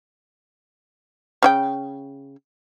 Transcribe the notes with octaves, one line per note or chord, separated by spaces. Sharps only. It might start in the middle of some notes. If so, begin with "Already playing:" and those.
C#3 F#4 G5